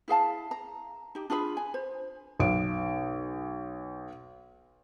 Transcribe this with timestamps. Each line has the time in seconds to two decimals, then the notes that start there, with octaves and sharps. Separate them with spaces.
0.08 E4 G#4 F5 A5
0.51 A#5
1.15 D#4 G4
1.30 D4 F4 G#4 B5
1.57 G#5
1.74 C5
2.39 B1 D7